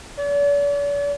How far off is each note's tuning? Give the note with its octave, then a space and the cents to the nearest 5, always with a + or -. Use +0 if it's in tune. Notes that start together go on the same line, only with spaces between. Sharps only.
D5 -45